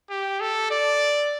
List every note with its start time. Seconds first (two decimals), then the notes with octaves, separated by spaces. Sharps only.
0.10 G4
0.40 A4
0.71 D5